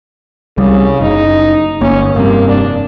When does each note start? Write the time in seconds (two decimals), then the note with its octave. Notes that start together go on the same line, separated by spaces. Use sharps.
0.58 C2 C#3 G3
1.01 F#1 D#4
1.81 G1 A#3 C#4
2.15 F1 G2 C3 A#3
2.49 D4